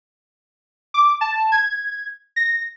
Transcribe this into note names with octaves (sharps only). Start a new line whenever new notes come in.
D6
A5
G#6
A#6